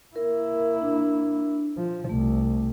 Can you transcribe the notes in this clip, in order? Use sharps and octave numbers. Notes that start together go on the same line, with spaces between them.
A#3 E4 A#4
D4
F3
C2 A3